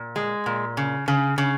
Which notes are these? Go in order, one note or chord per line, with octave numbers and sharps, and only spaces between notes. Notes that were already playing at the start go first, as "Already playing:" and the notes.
Already playing: A#2
G#3
A#2
C#3
C#3
C#3